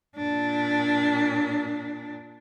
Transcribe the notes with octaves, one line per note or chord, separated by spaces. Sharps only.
A#2 D4